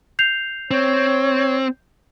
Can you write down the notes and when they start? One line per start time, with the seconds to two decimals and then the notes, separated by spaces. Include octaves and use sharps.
0.19 G6 C7 F7
0.71 C4 C#5